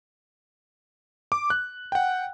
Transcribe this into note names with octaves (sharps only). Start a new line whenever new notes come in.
D6
F#6
F#5 G5